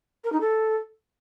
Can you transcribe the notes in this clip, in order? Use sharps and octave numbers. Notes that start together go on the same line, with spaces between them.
A#4
D#4
A4